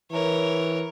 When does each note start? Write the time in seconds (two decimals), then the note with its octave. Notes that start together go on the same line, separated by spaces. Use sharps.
0.11 E3 A#4 C#5